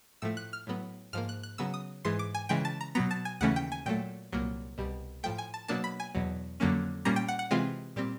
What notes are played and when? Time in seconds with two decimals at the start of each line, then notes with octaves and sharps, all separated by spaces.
0.22 A2 F3 A3 E6
0.37 F#6
0.53 F6
0.67 A2 F#3 B3
1.13 G#2 F3 A#3 F6
1.29 F#6
1.43 F#6
1.58 C#3 F#3 B3 E6
1.74 D#6
2.05 G#2 E3 G#3 C6
2.19 D6
2.34 G#5
2.49 C#3 E3 G#3 G5
2.65 A5
2.81 A#5
2.95 B2 F#3 B3 A#5
3.11 A5
3.25 G#5
3.41 D#2 C#3 E3 A3 C#4 F#5
3.56 G5
3.72 G#5
3.86 A#2 F#3 A3 G5
4.32 C2 A#2 F#3 A#3
4.78 C2 B2 G3
5.23 A2 F3 A3 G5
5.38 G#5
5.54 A5
5.68 B2 F#3 A#3 D4 A5
5.84 B5
6.00 G#5
6.15 E2 B2 F#3
6.60 F2 D3 F#3 A#3 C#4
7.05 A#2 G3 A#3 C#4 A#5
7.16 G5
7.28 F#5
7.39 F#5
7.51 C3 E3 G#3 C4 F4
7.96 A#2 G3 C4